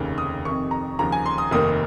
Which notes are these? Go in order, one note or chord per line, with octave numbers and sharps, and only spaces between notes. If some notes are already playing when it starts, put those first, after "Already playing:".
Already playing: F1 D#2 C#3
D#6
F2 C3 D#3 C#6
A#5
D#2 C#3 F3 A#5
G#5
C6
D#6
F1 D#2 D#3 A#3 D#6